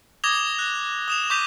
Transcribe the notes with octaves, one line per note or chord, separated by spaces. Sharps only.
D6 D#6 G#6 A#6 F7 G7
F#6
D#6 E7 F7
C#6 D6 G6 B6 D#7 F7